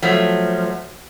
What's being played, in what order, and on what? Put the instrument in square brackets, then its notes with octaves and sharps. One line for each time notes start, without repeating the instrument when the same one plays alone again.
[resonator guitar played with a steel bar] F3 F#3 A3